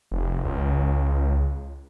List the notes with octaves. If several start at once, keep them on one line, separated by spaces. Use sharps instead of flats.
F1
C#2